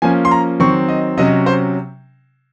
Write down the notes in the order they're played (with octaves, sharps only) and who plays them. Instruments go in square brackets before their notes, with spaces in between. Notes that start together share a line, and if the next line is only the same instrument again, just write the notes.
[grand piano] F3 A#3 C#4 G#5
C6
A#5
D#3 F#3 C4 C#6
D#5
C3 F#3 C#4 D#5
C5